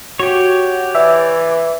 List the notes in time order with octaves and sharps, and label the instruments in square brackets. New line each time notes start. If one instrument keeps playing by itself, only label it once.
[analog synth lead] F#4 [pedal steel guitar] G4 C#5
[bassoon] E3 [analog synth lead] D5 [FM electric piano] E5